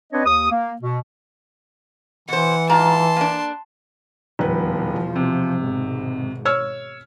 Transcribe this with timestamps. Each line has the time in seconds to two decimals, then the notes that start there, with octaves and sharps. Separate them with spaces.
0.12 C4 D4 B4 C#5 D#5
0.25 D#2 D#6
0.50 A#3
0.82 B2
2.28 B2 E3 C5 F#5
2.69 G#2 F4 A5 A#5 C6
3.16 A#3 D4
4.39 D#1 E2 B2 F3 B4
5.16 C3
5.60 G#1 G#2 B2
6.45 C#5 E6 F6